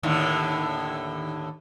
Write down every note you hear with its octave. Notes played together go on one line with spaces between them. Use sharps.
D#2 A2 D3